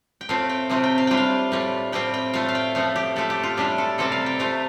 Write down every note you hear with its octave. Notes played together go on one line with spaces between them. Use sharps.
G5
A2 A3 C4 F4 F5
G5
C3 A3 C4 F4
G5
F5
A2 G3 D4 F4 G5
F5
A2 G3 F4
A2 G3 C4 F4 G5
G5
A2 A3 F4 F5
F5
G5
A2 F3 A3 F5
G4
A2 A3 F4 A4
G4
F4
A2 G3 D4 F4 G4
A4
C3 G3 C4 F4 A4
F5
G5
C3 A3 F4 F5